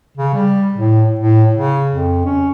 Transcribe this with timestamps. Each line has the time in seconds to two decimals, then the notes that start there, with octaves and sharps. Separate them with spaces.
0.17 C#3
0.34 G3
0.74 A2
1.19 A2
1.53 C#3
1.91 F2
2.25 C#4